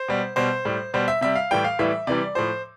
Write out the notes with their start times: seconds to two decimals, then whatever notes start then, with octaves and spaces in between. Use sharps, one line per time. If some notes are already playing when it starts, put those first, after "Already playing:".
Already playing: C5
0.08 B2 G3
0.36 B2 G3 C5
0.65 A2 G3
0.94 B2 G3 C5
1.08 E5
1.21 C3 G3 E5
1.35 F5
1.51 A2 E3 G3 G5
1.64 F5
1.79 A2 E3 G3 E5
2.07 C3 E3 G3 D5
2.35 A2 F3 C5